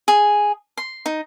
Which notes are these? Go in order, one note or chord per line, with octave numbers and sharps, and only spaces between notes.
G#4
C6
D#4